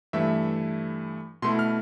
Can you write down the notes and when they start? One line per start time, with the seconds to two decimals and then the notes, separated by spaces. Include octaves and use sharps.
0.13 G2 E3 A3 E5
1.42 B2 A3 E4 C6
1.59 F6